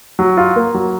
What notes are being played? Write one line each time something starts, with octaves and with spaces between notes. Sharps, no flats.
F#3
F4
A#3
F#3